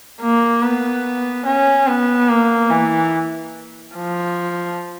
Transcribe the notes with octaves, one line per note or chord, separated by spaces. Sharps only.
A#3
B3
C#4
B3
A#3
E3
F3